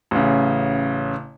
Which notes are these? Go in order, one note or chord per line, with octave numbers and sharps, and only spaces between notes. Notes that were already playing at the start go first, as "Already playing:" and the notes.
A1 C#3